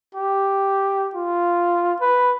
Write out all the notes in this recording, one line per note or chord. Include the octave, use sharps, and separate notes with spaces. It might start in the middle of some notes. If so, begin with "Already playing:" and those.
G4
F4
B4